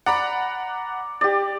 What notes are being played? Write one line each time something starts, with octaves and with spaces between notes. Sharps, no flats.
D5 F#5 A#5 B5
G4 D5